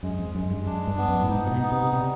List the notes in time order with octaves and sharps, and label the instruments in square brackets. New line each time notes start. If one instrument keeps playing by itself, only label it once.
[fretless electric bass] F#2 [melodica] G#3
[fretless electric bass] F2
[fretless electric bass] F#2 [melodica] G#3
[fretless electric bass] G2
[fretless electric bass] F#2 [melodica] D4
[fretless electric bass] G2
[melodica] B3
[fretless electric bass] F#2
A2
[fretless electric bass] G#2 [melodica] D#4
[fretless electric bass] A#2
B2
[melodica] B3
[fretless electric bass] C3
[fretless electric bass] C3 [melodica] G3